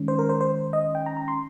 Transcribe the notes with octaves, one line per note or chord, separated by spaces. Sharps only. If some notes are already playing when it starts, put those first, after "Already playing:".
Already playing: D#3 G#3 C#4
C5
A#4
C5
C5
D#5
G5
A#5
A#5
C6